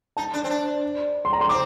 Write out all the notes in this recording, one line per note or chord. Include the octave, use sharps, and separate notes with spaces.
D#4 A5
D4
C4
D4
C6
A#5
C6
C4 D6